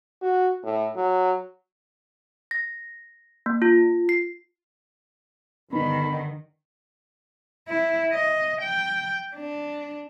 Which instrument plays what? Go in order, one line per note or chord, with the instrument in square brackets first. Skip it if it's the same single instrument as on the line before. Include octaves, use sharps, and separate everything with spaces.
[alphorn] F#4
A2
F#3
[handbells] A#6
A#3
F4
C7
[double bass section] G2 D3 [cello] D#3 [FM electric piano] B3 D#4 [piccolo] B5
[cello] E4
D#5
G5
D4